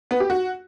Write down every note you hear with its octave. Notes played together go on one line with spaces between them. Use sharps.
B3
G4
F#4